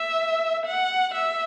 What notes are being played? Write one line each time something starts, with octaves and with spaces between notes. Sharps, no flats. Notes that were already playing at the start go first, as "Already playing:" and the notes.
Already playing: E5
F#5
E5